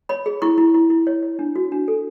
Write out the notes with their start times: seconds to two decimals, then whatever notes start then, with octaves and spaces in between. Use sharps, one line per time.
0.09 C#5 B5
0.26 G#4
0.42 E4 C#6
0.58 E4
0.74 E4
0.90 E4
1.07 C#5
1.23 C#5
1.39 D4
1.56 F#4
1.72 D4
1.88 A4